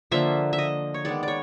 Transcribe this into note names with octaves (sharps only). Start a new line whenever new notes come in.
D3 F3 A#3 E5
E5
D#5
C#5
D#3 G#3 B3 D5
C#5 D5